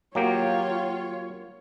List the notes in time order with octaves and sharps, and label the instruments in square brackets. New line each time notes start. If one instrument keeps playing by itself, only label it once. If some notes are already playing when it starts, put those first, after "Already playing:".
[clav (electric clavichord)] F#3 A#3 G4 [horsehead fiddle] F4 C#5